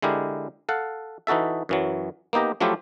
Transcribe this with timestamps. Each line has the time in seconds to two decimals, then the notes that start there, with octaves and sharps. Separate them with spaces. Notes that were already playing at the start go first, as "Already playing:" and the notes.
0.02 D3 G#3 E4 G4 A#4
0.69 A4 F5 F#5
1.27 E3 D#4 F#4 A4 E5
1.69 F#2 E3 F#3
2.33 A#3 B3 D#4 G4 A#5
2.61 F3 F#3 A3 E4 F4 G4